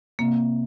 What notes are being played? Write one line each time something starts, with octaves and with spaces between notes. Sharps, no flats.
C3 A#3